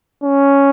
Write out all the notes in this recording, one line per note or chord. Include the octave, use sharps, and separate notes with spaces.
C#4